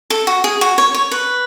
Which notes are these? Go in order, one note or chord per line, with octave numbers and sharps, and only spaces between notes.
A4
F#4
G#4
F#4
C#5
C#5
B4